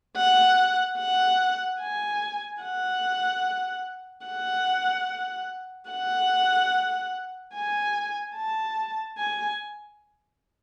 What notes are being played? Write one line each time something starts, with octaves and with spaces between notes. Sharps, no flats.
F#5
F#5
G#5
F#5
F#5
F#5
G#5
A5
G#5